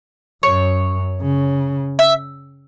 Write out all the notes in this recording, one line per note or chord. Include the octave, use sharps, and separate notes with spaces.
F#2 C#5
C#3
E5